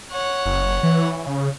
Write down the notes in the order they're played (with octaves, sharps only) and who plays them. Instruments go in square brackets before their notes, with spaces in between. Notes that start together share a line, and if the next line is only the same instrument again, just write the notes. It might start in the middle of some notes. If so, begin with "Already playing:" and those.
[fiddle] C#5 F#5
[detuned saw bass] F#1
E3
C#3